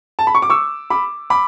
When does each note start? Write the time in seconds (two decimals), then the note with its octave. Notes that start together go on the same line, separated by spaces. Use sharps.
0.19 A5
0.27 B5
0.35 C#6
0.42 D6
0.50 C#6 E6
0.90 B5 D6
1.30 B5 D6